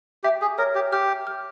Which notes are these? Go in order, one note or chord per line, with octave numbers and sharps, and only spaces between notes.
G4 E5
G#4
A#4 C#5
G4
G4 F6
F6